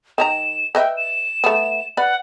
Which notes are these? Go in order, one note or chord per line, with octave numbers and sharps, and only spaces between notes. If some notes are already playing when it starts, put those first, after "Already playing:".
D#3 G#4 A#5 E7
B4 D#5 E5 G5
E7
A3 B3
B4 D5 F#5 B5